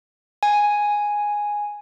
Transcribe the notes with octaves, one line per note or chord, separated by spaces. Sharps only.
G#5